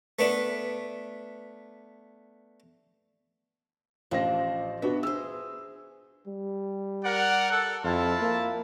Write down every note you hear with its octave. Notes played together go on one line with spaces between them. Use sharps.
A3 B3 D4
A1 F3 D4 C5 A#6
B3 D4 F#4 E5
G#4 C5 E6
G3
A#4 D5 F#5
A4 F#5
F2 E4 F4 A5
A#3